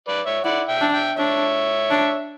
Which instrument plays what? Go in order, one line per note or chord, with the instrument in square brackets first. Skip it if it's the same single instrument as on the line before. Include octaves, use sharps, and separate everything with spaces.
[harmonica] B4 D5
C#5 E5
[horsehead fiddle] E4 [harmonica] D5 F#5
[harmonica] E5 G5
[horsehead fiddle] D4
[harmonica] E5 G5
[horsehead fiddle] D4 [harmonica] C#5 E5
[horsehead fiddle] D4